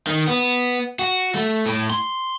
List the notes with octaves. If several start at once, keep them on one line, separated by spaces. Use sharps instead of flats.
D#3
B3
F#4
A3
A2
C6